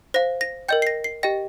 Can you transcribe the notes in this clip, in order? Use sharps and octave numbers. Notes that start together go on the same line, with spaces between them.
C5 F5 A#6
A#6
A#4 D#5 G5 G6
C7
A#6
C7
G4 D#5 G5 A#6